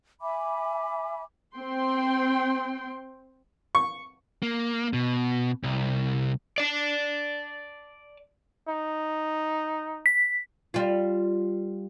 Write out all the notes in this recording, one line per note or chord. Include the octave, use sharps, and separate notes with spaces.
E5 G#5 B5 D6
C4 G5 C6
C#6
A#3
B2
C2
D5 A5
D#4
B6
G3 F4